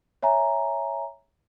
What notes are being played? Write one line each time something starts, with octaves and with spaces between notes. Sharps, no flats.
C#5 E5 G#5 A#5